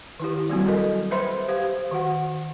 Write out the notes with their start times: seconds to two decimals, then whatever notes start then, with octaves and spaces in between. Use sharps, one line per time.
0.20 D#3 E4 G4
0.50 F#3 G3 A#3 C4 F#4
0.66 F#4 A4 A#4 D#5
1.11 B4 C5 E5 B5 C6
1.48 G4 C5 F5
1.91 D#3 F#4 F#5